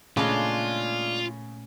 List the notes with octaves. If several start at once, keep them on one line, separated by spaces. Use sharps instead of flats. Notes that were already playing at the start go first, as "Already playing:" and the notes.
A#2 C#3 G#3 A3 C#4 D4 F4